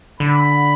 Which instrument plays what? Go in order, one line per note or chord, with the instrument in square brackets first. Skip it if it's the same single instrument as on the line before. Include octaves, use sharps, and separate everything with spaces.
[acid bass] D3 [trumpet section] B5